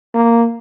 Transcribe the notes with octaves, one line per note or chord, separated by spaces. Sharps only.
A#3